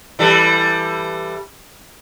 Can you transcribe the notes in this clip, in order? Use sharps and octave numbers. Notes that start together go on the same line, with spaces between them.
E3 G3 A4